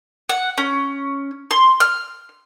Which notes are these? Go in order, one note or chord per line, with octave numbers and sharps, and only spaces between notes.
F#5
C#4
C6
F6